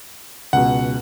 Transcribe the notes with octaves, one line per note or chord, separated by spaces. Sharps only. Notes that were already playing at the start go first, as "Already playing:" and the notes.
C#2 B2 F#5